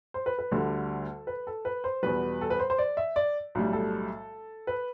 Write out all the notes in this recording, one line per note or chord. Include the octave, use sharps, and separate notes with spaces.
C5
B4
B4
D2 D3 G3 A4
B4
A4
B4
C5
E2 B2 G3 B4
A4
B4
C5
C5
D5
E5
D5
B1 A2 G3
A4
B4